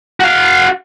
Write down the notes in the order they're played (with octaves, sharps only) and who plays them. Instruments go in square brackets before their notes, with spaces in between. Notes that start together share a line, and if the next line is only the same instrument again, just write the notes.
[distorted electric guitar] F#4 F5